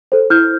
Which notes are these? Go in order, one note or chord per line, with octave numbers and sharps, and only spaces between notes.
A4 C5
E4 F6 G6